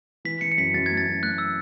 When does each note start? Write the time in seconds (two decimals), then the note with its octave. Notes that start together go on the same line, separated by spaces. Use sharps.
0.25 E3 B6
0.41 E3 C#7
0.52 C#7
0.58 F#2 B6
0.74 F#2 A6
0.86 A3 G#6
0.97 A6
1.06 F#2
1.23 A3 F#6
1.38 E6